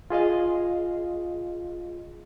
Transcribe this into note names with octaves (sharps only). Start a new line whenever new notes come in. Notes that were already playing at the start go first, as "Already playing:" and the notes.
F4 G#4 D#5 F5